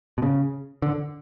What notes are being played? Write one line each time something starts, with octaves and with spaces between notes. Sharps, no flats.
B2
C#3
D3